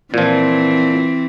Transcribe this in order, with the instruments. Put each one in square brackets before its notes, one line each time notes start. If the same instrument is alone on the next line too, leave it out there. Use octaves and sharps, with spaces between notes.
[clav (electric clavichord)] A#2 F3 [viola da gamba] E3 C4